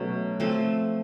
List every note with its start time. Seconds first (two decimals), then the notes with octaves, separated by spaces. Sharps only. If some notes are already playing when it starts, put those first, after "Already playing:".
Already playing: B2 F#3 A3 C#4
0.40 F3 A3 C4